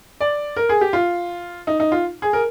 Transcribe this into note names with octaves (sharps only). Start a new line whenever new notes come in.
D5
A#4
G#4
G4
F4
D#4
D#4
F4
G#4
A#4